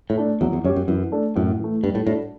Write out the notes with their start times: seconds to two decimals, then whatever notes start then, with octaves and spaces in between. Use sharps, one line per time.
0.10 A2
0.18 A3 D4
0.41 E2 F#3
0.53 E2
0.64 F#2 C#4 G4
0.76 F#2
0.88 F#2 E3
1.12 A3 D4 A4
1.35 F#2 A2
1.60 E3 A3
1.83 G2 G3
1.95 A2
2.07 A2 D4 F#4 A4